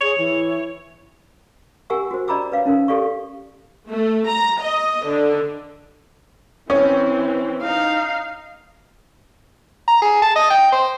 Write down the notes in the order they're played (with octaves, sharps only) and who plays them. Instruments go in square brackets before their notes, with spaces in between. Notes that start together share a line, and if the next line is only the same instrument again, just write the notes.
[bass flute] G#4 [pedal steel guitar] C#5
[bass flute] E3
[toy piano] G4 A#4 F#5 G#5 C#6 E6
F#4 C5
D5 D#5 A#5 B5 D6 E6
B4 C#5 F5
C#4 D#4 A#4
G4 A4 D5 F5 C#6
[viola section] A3
A#5
D#5
D3
[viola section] E3 C4 [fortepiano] C#4
[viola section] D#4 [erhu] F5
[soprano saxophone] A#5
G#4
A5
D#5
G5
C5